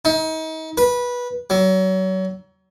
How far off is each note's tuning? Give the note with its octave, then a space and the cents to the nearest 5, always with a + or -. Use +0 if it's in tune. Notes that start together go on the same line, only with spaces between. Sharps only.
D#4 +35
B4 -15
F#3 +30